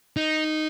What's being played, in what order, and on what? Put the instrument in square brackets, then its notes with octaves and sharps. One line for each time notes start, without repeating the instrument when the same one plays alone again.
[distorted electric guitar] D#4